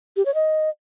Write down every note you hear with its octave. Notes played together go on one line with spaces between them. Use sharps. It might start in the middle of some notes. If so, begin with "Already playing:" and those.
G4
C#5
D#5